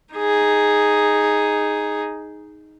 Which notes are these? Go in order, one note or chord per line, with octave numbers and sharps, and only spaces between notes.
D#4 G#4